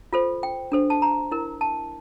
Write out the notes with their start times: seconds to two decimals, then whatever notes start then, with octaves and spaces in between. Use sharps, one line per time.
0.13 F4 A4 C5
0.43 G5
0.72 D4 A4 C5
0.90 A5
1.02 A#5
1.32 E4 A#4
1.61 A5